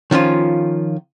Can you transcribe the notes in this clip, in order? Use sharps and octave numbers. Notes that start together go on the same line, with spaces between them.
D#3 F3 C#4 F4